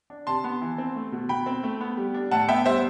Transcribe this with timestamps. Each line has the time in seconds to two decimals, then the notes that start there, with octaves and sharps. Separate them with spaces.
0.10 D4
0.27 C3 A5 C6
0.44 B3
0.61 E3
0.78 C4
0.95 A3
1.12 B2
1.29 B2 G5 B5
1.46 C4
1.63 A3
1.81 B3
1.97 G3
2.14 D4
2.31 A2 F#5 A5
2.48 B3 E5 G5
2.65 G3 C5 E5